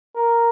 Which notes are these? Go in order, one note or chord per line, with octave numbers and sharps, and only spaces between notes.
A#4